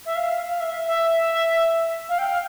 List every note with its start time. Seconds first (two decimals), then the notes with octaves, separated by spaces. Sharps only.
0.06 E5
0.16 F5
0.47 F5
0.60 E5
0.87 E5
2.09 F5
2.19 G5
2.30 F5